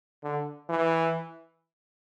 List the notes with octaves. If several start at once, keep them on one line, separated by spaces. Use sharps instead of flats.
D3
E3